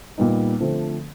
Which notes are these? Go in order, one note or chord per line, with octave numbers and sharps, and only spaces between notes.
A#2 G3 B3 D#4
D3 F3 A3 C4